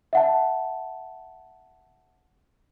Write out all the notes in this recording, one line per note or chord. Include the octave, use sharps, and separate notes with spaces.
E5 F#5 A5